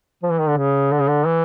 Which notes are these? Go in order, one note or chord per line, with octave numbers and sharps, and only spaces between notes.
F3
E3
D#3
D3
C#3
D3
C#3
D3
E3